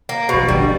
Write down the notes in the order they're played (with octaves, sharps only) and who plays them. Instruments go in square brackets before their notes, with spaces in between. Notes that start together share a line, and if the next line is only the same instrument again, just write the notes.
[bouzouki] A#3
[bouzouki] B2 [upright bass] F3
[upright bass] E3
[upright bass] D#3 [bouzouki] G3
[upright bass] D3